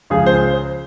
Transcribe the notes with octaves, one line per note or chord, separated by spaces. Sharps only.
C#2 C#3 F3 G#4
C5